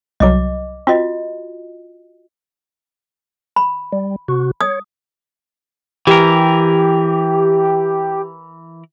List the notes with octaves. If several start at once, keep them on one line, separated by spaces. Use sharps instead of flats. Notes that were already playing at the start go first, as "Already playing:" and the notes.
C2 F#3 D#5 D6
C4 F4 F#4 D#5
B5
G3
C3 F#4
C#5 D#6
E3 G4 A#4